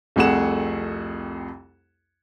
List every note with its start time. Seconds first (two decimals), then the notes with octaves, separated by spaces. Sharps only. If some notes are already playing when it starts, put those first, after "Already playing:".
0.16 C2 F2 A3 G#4 F#5 E7